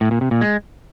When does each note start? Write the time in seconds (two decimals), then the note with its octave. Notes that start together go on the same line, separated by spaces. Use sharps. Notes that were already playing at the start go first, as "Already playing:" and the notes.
0.01 A2
0.11 A#2
0.21 C3
0.31 A#2
0.41 G#3